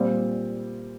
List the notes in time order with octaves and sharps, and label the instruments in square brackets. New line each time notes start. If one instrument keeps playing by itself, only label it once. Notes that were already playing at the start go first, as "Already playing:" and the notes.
Already playing: [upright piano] A#2 G3 C4 F4